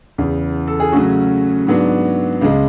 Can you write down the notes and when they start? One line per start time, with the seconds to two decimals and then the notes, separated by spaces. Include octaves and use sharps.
0.18 E2 C#3 E3
0.67 A4
0.80 G#4
0.92 C#3 F#3 A3 C#4 F#4
1.67 G#2 F#3 B3 D4
2.41 C#2 C#3 G#3